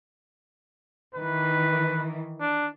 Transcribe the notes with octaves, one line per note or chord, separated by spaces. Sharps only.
D#3 E3 B4
D4